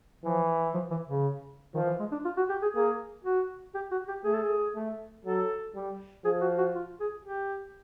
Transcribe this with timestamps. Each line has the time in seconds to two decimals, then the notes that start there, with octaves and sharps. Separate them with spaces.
0.24 E3 F3
0.74 F3
0.91 E3
1.08 C#3
1.75 D#3 F3
1.87 E3
1.99 G#3
2.12 D4
2.25 F4
2.37 F#4
2.49 G4
2.62 G#4
2.75 A#3 G#4
3.25 F#4
3.75 G4
3.91 F#4
4.08 G4
4.24 A3 G#4
4.34 A4
4.43 G#4
4.75 A3
5.25 F#3 A4
5.75 G3
6.25 F3 G#4
6.41 F#4
6.58 F#4
6.75 F4
7.00 G#4
7.25 G4